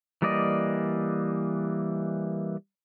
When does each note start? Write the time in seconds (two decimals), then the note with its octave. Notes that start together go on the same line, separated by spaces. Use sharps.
0.22 E3 G3 A#3 D5 D#5